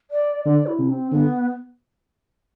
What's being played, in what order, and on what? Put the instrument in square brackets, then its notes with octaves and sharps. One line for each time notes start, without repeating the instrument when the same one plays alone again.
[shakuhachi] D5
[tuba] D3 [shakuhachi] D5
[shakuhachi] E4
[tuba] C3
[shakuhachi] C4
[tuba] D3 [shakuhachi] B3